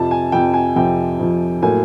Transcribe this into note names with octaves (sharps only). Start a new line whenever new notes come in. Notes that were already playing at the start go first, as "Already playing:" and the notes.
Already playing: F2 C3 F3 A5
G#5
F2 C3 F3 G5
G#5
F2 C3 F3 G5
F2 C3 F3
A2 F#3 A#3 G#5